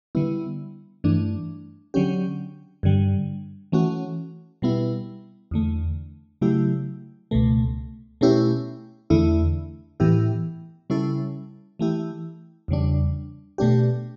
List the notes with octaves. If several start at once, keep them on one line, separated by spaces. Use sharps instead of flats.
D3 G3 B3 E4
G2 E3 A3 D4
D3 F#3 C#4 G4
G2 D3 G3
E3 A3 C#4 F#4
B2 G3 B3 E4
E2 D3 A3
C#3 F#3 A3 E4 G4
C#2 B2 A3
B2 A3 C#4 E4 G4
E2 D3 A3 E4
A2 E3 B3 E4 G4
C#3 G3 C#4 E4 A4
E3 A3 E4 G4
E2 C#3 G3 D4
B2 A3 D4 G4